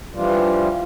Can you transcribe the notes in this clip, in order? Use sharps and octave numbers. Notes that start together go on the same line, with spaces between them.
E3 F3 G3 D4 F4